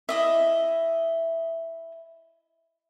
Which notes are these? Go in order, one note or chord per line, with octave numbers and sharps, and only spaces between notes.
E4 D#5 E5